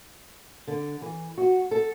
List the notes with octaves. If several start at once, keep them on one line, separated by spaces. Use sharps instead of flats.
D3
E3
F#4
A4